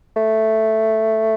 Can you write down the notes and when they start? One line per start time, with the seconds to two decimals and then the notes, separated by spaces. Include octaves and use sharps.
0.17 A3